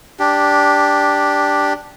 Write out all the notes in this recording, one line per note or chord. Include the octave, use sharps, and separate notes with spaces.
D4 G4